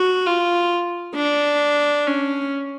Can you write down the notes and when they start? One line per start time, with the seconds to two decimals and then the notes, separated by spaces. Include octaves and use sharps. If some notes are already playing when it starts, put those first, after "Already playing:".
Already playing: F#4
0.26 F4
1.16 D4
2.07 C#4